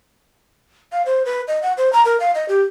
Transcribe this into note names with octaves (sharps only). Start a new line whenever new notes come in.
F5
C5
B4
D#5
F#5
C5
A#5
A#4
F5
D#5
G4